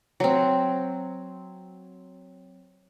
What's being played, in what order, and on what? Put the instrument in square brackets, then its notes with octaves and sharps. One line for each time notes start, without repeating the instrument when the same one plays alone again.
[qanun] F#3 C4